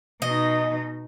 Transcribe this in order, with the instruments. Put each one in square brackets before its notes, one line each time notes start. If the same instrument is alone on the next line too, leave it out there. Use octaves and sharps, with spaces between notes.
[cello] B2 D#4 [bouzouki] D#5